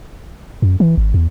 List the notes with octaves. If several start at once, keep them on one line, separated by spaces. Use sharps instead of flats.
F#2
E3
G#1
E2